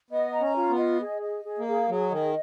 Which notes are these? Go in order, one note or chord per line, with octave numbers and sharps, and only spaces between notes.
B3 D#5
A#5
C#4
F4
B3
D#5
G#4
D#5
G#4
A#3
G#4
F#3 G#4
D#3 D#5